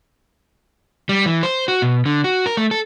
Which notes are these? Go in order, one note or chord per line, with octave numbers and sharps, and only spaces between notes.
G3
E3
C5
F#4
B2
D3
F#4
A#4
A3
A4